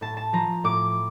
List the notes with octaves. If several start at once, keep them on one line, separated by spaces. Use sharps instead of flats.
A2 A5
A5
F3 A#5
A2 D6